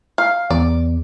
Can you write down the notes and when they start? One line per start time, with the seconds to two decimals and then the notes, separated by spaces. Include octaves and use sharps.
0.18 F5
0.50 E2 D5